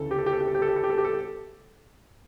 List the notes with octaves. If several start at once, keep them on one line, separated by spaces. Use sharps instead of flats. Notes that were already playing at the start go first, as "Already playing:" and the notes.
Already playing: D2 C#3 E3 A4
G4
A4
G4
A4
G4
A4
G4
A4
G4
A4
G4
A4
G4
A4